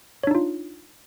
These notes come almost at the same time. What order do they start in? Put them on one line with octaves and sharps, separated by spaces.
C#5 D4 D#4 F4